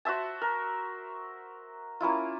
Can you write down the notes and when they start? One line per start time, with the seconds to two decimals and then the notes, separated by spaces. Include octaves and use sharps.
0.05 F#4 C5 E5 A5
0.41 A#4
2.00 A#3 C#4 E4 F4